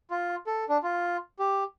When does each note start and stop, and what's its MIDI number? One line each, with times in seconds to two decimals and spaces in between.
0.11 0.35 65
0.47 0.64 69
0.69 0.77 62
0.83 1.17 65
1.39 1.64 67